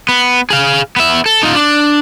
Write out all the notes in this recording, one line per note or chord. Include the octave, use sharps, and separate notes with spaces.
B3
G#4 F5
B3 E5
A4
D#4 F4
D4